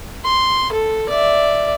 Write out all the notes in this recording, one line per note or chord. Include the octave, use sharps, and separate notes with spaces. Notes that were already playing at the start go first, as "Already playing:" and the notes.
C6
A4
D5 E5